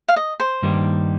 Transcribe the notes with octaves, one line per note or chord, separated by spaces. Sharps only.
F5
D#5
C5
G2 D#3 G3 A#3 D#4